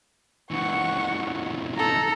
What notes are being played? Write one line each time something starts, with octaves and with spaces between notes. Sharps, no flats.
C#2 E3 F#5 C#6
D#4 A4 A#5